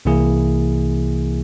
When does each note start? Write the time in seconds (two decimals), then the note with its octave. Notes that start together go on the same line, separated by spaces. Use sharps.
0.05 C2 C3 E3 A#3 E4 G#4